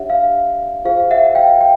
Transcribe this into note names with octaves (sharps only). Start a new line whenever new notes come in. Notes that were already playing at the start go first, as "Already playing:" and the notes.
Already playing: D4 G4 C#5 E5 F#5
F5
F4 G#4 C5 F5
E5 F#5
F5 G5
G5